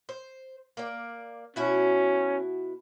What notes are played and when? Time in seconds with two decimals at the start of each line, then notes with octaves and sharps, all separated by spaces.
0.09 C5
0.77 A#3 D5
1.56 B2 C#4 E4 F#4